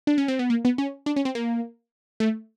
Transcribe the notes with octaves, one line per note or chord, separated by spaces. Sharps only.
D4
C#4
C4
B3
A#3
B3
C#4
D4
C#4
C4
A#3
A3